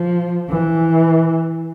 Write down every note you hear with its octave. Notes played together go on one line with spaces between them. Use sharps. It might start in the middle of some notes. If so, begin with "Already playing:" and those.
Already playing: F3
E3